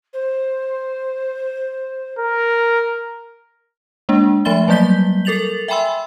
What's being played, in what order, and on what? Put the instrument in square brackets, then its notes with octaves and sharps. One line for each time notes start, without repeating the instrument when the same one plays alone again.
[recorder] C5
[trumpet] A#4
[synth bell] G#3 A#3 D4
F3 A3 E5 B5 A6 G7
F#3 G3 A#3 G6 B6 G7
A4 A#4 A6 F7 F#7
E5 G5 G#5 B5 C6 E6